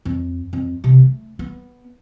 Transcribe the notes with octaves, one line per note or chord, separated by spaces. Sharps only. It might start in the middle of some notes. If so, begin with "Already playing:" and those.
F2
F2
C3
A3
B3